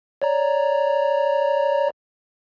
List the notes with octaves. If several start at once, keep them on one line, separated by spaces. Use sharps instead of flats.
C#5 D5 A#5